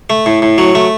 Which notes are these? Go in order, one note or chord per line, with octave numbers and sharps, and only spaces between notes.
A3
A2
A2
F#3
A3